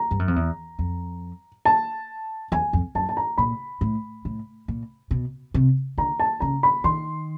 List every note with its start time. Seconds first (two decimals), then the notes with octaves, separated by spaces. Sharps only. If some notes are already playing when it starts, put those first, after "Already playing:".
Already playing: A#5
0.11 G2
0.19 F#2
0.28 F2
0.36 E2
0.79 F2
1.65 A5
2.52 E2 G#5
2.73 F2
2.95 F#2 A5
3.09 A5
3.17 A#5
3.38 A#2 B5
3.81 A2
4.25 A2
4.68 A#2
5.11 B2
5.54 C3
5.98 D3 A#5
6.20 A5
6.40 C#3 A#5
6.63 B5
6.84 D#3 C6